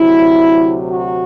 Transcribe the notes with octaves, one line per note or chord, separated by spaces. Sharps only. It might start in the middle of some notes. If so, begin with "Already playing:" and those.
Already playing: D2 C3 F#3 E4
F#4